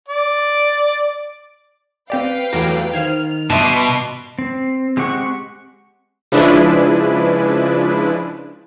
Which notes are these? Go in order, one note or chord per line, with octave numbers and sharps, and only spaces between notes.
D5
C4 G4 B4 D5 F5 G5
E2 F#3 A3 G4 A#5
D#3 C5 F5 F6 G#6
G2 B2 E5 A5 B5 C6 D6
C4
G#3 C4 G4 F#5 C#6
C#3 F3 G#3 D4 E4 B4